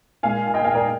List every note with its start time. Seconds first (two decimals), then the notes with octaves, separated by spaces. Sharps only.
0.23 A#2 G#3 F5 G#5
0.47 G#5
0.54 D#5 G5
0.64 F5 G#5
0.75 A#4 D5